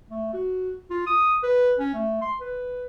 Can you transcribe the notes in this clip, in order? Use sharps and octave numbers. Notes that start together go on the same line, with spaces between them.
A3
F#4
F4
D#6
B4
C#4
A3
C6
B4